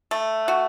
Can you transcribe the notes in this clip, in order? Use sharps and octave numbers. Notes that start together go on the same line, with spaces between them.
A3
F#4